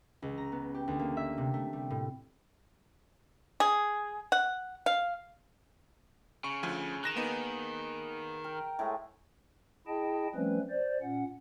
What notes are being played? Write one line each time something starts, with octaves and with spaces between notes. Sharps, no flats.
C#2
A#5
B3
G4
D2
A#3
E5
C3
A3
G3
A2
G#4
F#5
F5
C#3 C#6
D2 F3 G#5
D#3 G#4 F#6 A#6 E7
A#3 B3 D#4
A#4 G5
A2 G#3 A3
E4 G#4 D#5 G5 A5
F3 G3 A3 C4 C#4 B4
C5 D5
A#2 C#4 F#5